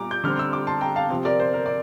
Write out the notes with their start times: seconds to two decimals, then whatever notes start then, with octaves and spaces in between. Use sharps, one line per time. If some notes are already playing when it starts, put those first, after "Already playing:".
Already playing: A#2 G3 A#5 D6
0.11 G6
0.24 D3 G3 C4 F6
0.39 E6
0.53 D6
0.67 A5 C6
0.81 G5 A#5
0.96 F5 A5
1.10 C3 F3 C4
1.25 A#4 D5
1.40 C5
1.54 A#4
1.66 D5